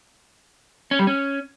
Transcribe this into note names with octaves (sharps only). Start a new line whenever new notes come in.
C#4
G3
C#4